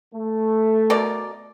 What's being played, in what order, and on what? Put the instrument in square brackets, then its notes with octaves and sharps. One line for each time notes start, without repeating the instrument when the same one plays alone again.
[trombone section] A3
[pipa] B2 A#4 D5